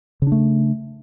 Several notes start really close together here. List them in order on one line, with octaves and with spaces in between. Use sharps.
C#3 D4 A3